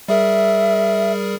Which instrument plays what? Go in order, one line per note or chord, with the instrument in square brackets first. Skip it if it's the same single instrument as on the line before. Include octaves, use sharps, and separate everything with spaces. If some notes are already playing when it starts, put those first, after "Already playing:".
[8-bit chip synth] G3 G#4 A#4 [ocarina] E5